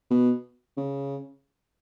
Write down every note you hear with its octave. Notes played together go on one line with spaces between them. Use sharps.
B2
C#3